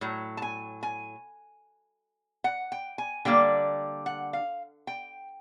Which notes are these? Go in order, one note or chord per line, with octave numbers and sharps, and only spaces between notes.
A2 F#3
A5
G#5
G#5
F#5
G5
G#5
D3 G3 A#3 D4 G5
F#5
F5
G5